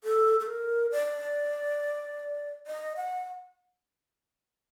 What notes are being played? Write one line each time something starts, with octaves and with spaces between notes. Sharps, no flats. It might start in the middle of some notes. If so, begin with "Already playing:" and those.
A4
A4
A#4
D5
D#5
F#5